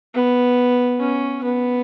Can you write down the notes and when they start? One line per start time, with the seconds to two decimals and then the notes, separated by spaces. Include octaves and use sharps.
0.14 B3
1.00 C#4
1.44 B3